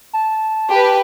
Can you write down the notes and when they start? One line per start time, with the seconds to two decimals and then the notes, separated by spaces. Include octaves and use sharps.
0.13 A5
0.70 G4 B4